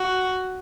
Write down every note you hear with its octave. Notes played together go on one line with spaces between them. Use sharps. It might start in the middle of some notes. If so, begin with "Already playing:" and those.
Already playing: F#4